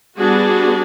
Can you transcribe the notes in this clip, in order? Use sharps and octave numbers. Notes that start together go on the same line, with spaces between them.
G3 B3 D4 F#4 G#4